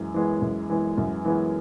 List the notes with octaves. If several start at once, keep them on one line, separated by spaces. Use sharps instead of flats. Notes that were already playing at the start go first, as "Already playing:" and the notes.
Already playing: F#2 E3 G#3
E3 G#3 B3
F#2
E3 G#3 B3
F#2
E3 G#3 B3